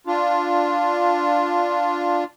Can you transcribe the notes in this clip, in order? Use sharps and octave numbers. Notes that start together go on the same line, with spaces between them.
D4 F4